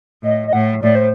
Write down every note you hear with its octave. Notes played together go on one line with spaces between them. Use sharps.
A2 D#5
D#5
A2 F#5
A2 D5
C5